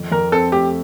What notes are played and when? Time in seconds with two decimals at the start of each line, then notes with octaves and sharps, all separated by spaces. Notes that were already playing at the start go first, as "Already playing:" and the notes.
Already playing: F2
0.12 F2 A#4
0.32 C4 A4
0.52 A3 G4